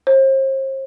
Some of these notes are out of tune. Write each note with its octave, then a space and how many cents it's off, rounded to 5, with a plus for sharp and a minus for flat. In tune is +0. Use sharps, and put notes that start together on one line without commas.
C5 +40